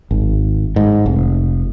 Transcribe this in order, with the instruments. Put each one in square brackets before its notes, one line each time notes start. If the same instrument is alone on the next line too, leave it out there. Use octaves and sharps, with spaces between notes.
[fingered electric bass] G#1
G#2
F1